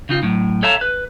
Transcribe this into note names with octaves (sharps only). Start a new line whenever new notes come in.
C#3 D#4 F4
A2 F#3
A4 C#5 E5 F5 A5 A#5
B4